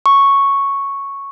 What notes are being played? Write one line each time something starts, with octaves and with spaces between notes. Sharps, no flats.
C#6